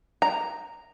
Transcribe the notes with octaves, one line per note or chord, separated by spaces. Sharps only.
A#5